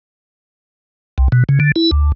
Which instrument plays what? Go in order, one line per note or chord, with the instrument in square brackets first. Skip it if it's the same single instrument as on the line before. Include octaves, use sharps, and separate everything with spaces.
[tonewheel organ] C2
B2
C#3
D3
E4
D2